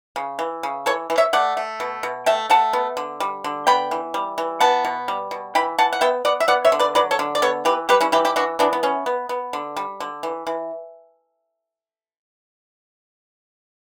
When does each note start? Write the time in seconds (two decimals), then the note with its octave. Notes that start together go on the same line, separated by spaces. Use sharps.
0.16 C#3
0.39 E3
0.63 C#3
0.86 E3 A4 C#5
1.10 E3
1.18 C#5 E5
1.33 A3 D5 F#5
1.57 A3
1.80 B2
2.03 B2
2.26 A3 E5 G5
2.50 A3 F#5 A5
2.73 B3
2.97 D3
3.20 G3
3.44 D3
3.67 B3 G5 B5
3.91 E3
4.14 G3
4.38 E3
4.60 B3 F#5 A5
4.85 B2
5.08 G3
5.31 B2
5.55 E3 G5 B5
5.78 E3 F#5 A5
5.93 F#5
6.01 B3 E5 G5
6.25 B3 D5 F#5
6.40 E5
6.48 B3 D5 F#5
6.65 C#5 E5
6.72 D3
6.79 B4 D5
6.95 F#3 B4 D5
7.11 A4 C#5
7.19 D3
7.35 D5
7.42 B3 A4 C#5
7.65 E3 G4 B4
7.89 G3 G4 B4
8.01 C#4 E4
8.12 E3 E4 G4
8.25 E4 G4
8.36 E3 D4 F#4
8.59 E3 B3 D4
8.73 B3
8.83 B3 C#4
9.06 B3
9.29 B3
9.53 D3
9.76 G3
10.00 D3
10.23 E3
10.47 E3